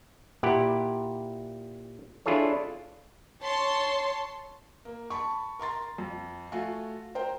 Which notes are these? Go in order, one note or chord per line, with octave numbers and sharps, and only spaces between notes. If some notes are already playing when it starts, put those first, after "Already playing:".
A#2 E4 G4 F#5
D4 E4 F4 G#4 A4 C#5
C#5 A5 C6
A#3
A5 B5 C#6
A#4 A#5 C6 A6
F2
A3 F4 F#4 F5 G#5
A#4 C5 G5